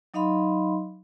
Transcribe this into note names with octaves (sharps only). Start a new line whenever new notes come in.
F#3 D#4 D#5 F5 B5 C6